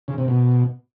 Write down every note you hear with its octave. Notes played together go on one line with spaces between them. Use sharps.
C#3
C3
B2